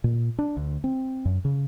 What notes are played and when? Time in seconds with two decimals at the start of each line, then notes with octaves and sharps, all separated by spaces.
0.04 A#2
0.39 D4
0.57 D2
0.84 C4
1.25 F#2
1.45 C#3